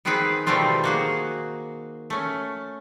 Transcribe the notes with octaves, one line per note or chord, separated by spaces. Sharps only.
D#3 B3 C4 D#4 G#4 B4
B2 D#3 G3 A3 C4 F4
A#3 F#4 G#4
A3 C#4